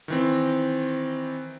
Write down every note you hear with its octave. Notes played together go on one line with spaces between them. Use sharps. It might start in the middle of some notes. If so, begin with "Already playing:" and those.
D#3 E3 C4